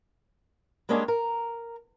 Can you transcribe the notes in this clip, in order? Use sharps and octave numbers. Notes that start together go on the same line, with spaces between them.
G3 G#3 A#3 C#4 D4 D#5
A#4